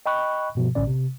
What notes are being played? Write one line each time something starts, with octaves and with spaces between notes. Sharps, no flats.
D#5 G5 B5 C#6 F#6
G2 B2 F3
A1 A2 D3 C#4 D5
C3